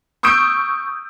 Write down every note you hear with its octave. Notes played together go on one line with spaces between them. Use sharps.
C#6 D#6 E6 G6 D7